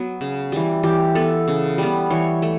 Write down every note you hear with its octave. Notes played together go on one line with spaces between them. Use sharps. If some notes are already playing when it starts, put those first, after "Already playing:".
Already playing: F#3 B3
C#3
E3 G3
E3 G4
B3 A4
C#3
G3 B3
E3 C#5
A3